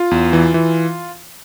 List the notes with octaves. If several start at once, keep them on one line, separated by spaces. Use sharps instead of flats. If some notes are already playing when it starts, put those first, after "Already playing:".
Already playing: F4
E2
E3
E3